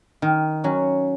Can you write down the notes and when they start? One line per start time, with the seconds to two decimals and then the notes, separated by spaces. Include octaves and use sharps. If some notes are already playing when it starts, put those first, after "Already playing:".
0.22 D#3
0.64 F#3 C#4